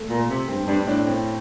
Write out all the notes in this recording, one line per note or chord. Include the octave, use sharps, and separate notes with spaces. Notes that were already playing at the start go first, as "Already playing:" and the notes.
Already playing: A3
A#2
C3
G2 C4
G2 D4
A2 D4
C4